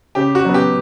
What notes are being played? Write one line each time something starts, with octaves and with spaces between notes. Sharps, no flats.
C#3 G4
F#4
F#3 B3
G4